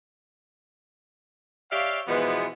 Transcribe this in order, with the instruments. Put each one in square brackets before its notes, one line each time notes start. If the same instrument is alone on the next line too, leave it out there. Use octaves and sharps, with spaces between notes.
[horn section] G4 C#5 D5 E5 F5
B2 E3 F3 G#3 B3